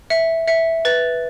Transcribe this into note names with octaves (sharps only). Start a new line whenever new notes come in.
E5 C#7
E5 C#7
B4 A6